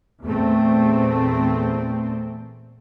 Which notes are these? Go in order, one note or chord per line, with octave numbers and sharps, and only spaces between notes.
E2 A#2 A3 C4